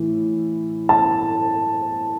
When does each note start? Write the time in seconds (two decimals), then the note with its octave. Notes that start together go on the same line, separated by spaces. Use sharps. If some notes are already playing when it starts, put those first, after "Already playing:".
Already playing: A2 E3
0.89 A5